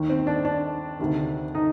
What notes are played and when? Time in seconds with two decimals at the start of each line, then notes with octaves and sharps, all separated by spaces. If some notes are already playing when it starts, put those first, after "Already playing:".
Already playing: D#2 D#3
0.10 C4
0.27 D4
0.45 D4
0.99 D2 C3 D#3
1.55 D#4